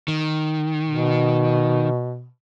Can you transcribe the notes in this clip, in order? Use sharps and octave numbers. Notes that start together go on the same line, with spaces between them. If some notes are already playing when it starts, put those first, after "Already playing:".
D#3
B2